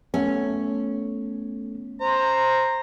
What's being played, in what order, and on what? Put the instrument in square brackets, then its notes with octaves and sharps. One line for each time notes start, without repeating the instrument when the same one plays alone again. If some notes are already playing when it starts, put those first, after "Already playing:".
[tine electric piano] A3 B3 A4 [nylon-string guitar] C#4
[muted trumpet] C5 [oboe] A#5